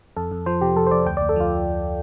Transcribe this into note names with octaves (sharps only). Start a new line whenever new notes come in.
F2 A4
F2
F3 C5
C3 G4
F2 A4
C5
F2 D5
D2 G5
D2 D5
A4
F3 F4